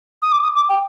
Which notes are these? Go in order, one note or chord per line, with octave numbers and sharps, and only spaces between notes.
D#6
D6
D#6
D6
G5